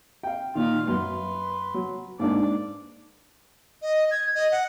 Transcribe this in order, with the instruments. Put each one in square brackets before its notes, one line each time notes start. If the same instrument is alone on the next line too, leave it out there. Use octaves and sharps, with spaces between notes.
[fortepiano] F5 G5
[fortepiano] A#2 D#3 [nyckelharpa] F4 F5
[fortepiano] F#2 [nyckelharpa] B4 C6
[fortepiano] F#3
[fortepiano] G#2 A#3 D4 [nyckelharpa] D5
[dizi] D#5
G#6
D#5
F#5